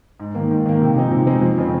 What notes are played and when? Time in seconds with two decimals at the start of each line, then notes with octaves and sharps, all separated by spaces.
0.20 G#2
0.35 D#3 A#3
0.51 G#2
0.66 D#3 A#3
0.82 C3
0.96 F3 G#3 C4 D#4
1.11 C3
1.27 F3 G#3 C4 D#4
1.42 F2
1.58 C#3 G#3 C4